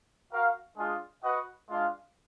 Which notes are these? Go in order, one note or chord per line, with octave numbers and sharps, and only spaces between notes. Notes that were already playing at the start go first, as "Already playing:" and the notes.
F#4 A#4 F5
G#3 D4 F4 G#4
F#4 B4 D#5 F#5
G#3 D4 F4